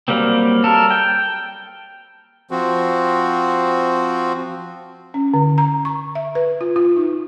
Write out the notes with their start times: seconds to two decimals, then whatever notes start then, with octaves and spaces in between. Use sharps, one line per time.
0.08 F#3 G3 A#3 C4
0.64 A4 A#4
0.91 G5
2.51 F3 C4 F#4
5.14 C#4
5.34 D3
5.58 A#5
5.85 C#6
6.15 E5
6.35 B4
6.61 F4
6.76 F4
6.97 D#4